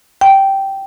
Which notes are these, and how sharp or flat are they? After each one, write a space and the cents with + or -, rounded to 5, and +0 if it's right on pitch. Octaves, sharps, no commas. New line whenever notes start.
G5 -10